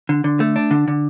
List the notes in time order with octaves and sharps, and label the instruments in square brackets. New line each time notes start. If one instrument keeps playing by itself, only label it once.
[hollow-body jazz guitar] D3
D3
A3
D4
D3
D3